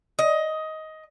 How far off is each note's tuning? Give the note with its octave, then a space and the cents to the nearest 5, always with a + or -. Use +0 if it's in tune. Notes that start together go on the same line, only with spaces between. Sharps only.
D#5 +15